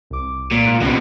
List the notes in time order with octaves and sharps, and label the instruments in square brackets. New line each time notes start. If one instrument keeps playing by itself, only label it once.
[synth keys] C2 D6
[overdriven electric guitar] A#2
[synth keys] G#2 F#6
[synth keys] C2 C#4 [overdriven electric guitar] C3 B3